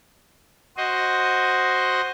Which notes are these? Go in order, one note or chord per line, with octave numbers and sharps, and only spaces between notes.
F#4 C5 D#5